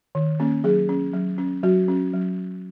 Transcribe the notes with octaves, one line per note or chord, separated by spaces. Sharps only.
D#3
A#3 C#4
F#3 G#4
C#4
F#3
C#4
F#3 F#4
C#4
F#3